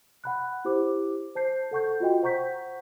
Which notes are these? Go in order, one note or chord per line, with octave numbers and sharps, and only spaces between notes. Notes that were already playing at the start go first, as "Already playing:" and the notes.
F#5 B5 F#6
E4 G4 C5 D6
C5 A5 G6 C7
A4 F#5 C#6 G6
F4 F#4 D#5 G5
C5 F#5 A#5 C#6 G6 B6